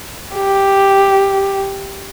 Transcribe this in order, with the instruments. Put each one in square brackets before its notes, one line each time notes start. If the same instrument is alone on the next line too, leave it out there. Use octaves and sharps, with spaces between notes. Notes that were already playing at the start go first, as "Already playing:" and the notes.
[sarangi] G4